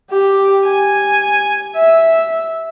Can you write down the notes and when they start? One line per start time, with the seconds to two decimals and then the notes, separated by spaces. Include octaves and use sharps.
0.10 G4
0.65 G#5
1.76 E5